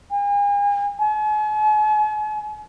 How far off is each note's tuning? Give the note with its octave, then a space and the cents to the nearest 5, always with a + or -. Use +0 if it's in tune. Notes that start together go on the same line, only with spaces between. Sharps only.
G#5 -40
G#5 +40